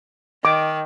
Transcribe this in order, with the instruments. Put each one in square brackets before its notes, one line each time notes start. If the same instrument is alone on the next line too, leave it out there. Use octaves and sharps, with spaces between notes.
[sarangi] D#3 [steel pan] D6